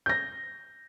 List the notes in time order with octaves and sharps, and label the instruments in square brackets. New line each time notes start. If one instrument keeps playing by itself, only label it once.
[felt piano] G6 A#6